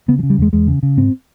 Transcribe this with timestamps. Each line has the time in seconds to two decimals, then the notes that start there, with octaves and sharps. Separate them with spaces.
0.08 C#3 B3
0.19 F3
0.23 C#3
0.30 G3
0.38 E2 G#3
0.53 E2 G#3
0.67 C#3
0.83 C#3
0.97 G#2 C4